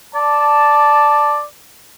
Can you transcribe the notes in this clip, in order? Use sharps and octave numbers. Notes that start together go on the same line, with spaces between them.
D5 A5